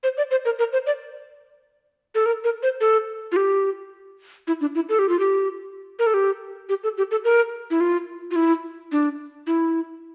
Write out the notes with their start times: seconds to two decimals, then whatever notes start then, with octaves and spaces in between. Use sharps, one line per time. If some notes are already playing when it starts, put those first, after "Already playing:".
0.03 C5
0.18 D5
0.31 C5
0.45 A#4
0.59 A#4
0.73 C5
0.86 D5
2.15 A4
2.26 A#4
2.44 A#4
2.63 C5
2.81 A4
3.32 F4
3.36 G4
4.48 E4
4.61 D4
4.75 E4
4.89 A4
4.99 G4
5.09 F4
5.20 G4
5.99 A#4
6.07 A4
6.14 G4
6.69 G4
6.83 A4
6.98 G4
7.11 A4
7.24 A#4
7.71 E4
7.81 F4
8.31 F4
8.36 E4
8.92 D4
9.47 E4